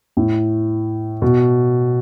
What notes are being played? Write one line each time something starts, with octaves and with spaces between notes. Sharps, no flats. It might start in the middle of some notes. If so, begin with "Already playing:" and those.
A2
B2